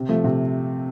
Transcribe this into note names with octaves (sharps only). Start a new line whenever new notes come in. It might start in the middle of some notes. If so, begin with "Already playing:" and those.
Already playing: C3
F3 A3
C3